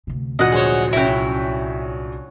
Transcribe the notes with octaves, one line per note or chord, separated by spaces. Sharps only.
D2 C3
A#1 F#3 D#5 F#5
G#4 C5 C#5
C2 C#4 E4 F#4 G5